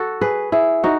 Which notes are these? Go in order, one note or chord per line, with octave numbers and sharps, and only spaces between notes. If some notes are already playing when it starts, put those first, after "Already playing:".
Already playing: F#4 A4
G#4 B4
E4 G#4
D#4 F#4